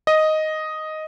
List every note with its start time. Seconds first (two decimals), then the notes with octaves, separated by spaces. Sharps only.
0.07 D#5